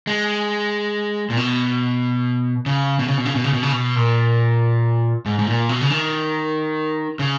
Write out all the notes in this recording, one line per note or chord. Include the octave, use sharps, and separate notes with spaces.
G#3
A#2
B2
C#3
B2
C#3
B2
C#3
B2
C#3
B2
C#3
B2
A#2
G#2
G#2
A#2
B2
C#3
D#3
C#3